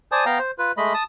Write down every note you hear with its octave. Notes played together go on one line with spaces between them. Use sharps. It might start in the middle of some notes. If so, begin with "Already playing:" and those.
C5 D5 G#5 A5 D#6
B3 F5 G5 A#5
C5
F4 B4
G#3 A3 D#5 B5
A5 D#6